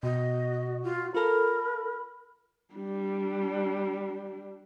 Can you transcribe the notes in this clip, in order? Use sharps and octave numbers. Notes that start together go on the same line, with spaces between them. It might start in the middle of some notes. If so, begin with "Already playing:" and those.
B2 F#4 D#5
F4
F4 A4 A#4 B5
G3 D4